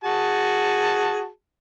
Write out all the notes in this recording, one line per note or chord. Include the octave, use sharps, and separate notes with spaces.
F#4 G#4 A5